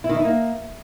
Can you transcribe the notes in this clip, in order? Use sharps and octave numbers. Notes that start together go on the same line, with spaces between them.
E4
D#3
E4
D#4
A#3